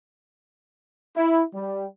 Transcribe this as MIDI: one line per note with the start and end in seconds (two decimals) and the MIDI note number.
1.17 1.43 64
1.54 1.86 55